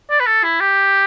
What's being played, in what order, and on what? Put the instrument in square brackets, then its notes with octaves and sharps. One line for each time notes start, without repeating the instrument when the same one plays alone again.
[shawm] D5
B4
A4
E4
G4